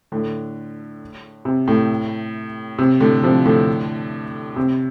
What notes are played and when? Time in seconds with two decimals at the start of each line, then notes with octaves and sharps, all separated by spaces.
0.12 A2 D3
1.45 C3
1.68 A2
2.78 C3
3.00 A2 D3
3.23 C3 F3
3.45 A2 D3
4.56 C3